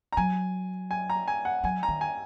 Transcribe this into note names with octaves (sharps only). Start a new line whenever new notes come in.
A#5
F#3 G#5
G#5
A#5
G#5
F#5
F#3 G#5
A#5
D#3
G#5